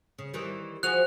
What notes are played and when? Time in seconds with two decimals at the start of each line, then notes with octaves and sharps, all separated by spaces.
0.18 C#3
0.34 D#3 E3 G3
0.83 F3 F#4 G#4 F#6 F7